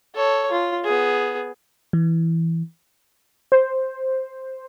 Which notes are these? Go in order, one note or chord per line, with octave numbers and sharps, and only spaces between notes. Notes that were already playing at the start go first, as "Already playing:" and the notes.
A4 C#5
F4
B3 G#4
E3
C5